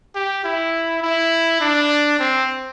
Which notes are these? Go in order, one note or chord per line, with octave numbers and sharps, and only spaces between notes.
G4
E4
E4
D4
C4